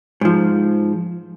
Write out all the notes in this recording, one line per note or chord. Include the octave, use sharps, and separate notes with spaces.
G#2 F3